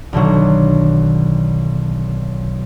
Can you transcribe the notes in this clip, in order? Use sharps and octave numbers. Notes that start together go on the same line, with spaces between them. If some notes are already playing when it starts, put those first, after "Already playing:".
B1 D3 D#3 F#3